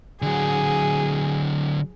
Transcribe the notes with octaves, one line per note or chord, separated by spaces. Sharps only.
D3 F#3 G#4